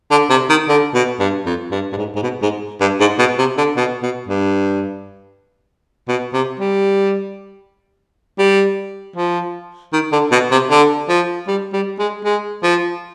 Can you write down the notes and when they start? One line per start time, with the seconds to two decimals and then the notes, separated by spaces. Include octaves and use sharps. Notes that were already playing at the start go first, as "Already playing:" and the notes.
0.11 D3
0.30 C3
0.50 D#3
0.69 D3
0.95 B2
1.20 G2
1.46 F2
1.72 G2
1.92 G2
1.97 G#2
2.16 G#2
2.23 B2
2.43 G#2
2.81 G2
3.00 G#2
3.19 B2
3.38 C3
3.58 D3
3.77 B2
4.03 B2
4.29 G2
6.08 B2
6.34 C3
6.60 G3
8.39 G3
9.16 F3
9.93 D#3
10.13 D3
10.32 B2
10.52 C3
10.71 D3
11.09 F3
11.48 G3
11.73 G3
12.00 G#3
12.25 G#3
12.63 F3